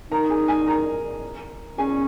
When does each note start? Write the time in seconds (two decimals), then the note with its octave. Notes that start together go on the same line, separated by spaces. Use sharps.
0.11 D#4 A#4 A#5
0.30 G#4 G#5
0.48 G#4 G#5
0.67 A#4 A#5
1.78 C#4 G#4 G#5